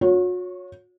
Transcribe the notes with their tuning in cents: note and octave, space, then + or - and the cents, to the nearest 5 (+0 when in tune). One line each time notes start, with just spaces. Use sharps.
F#4 -40 C#5 +0